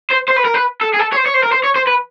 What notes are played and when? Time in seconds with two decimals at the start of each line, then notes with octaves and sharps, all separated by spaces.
0.11 C5
0.29 C5
0.37 B4
0.45 A#4
0.55 B4
0.81 A4
0.94 G#4
0.99 A4
1.12 C#5
1.16 C5
1.26 C#5
1.34 C5
1.43 A#4
1.52 C5
1.64 C#5
1.76 C5
1.87 B4